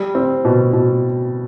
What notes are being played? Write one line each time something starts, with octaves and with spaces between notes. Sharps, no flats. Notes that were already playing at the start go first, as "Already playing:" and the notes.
Already playing: G3
C4
B2
B2